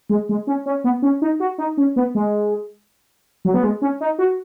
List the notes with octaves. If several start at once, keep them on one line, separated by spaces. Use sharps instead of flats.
G#3
G#3
C#4
C#4
B3
C#4
D#4
F#4
D#4
C#4
B3
G#3
F#3
B3
G#3
C#4
D#4
F#4